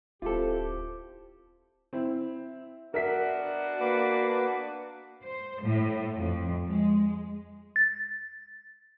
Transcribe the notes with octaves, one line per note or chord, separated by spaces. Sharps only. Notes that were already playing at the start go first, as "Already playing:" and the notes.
D1 C4 E4 F4 G4 A4
C4 E4
B3 D4 F#4 A#4 E5 B6
A#3 B4 D6
C5
A2
F2
G#3
A6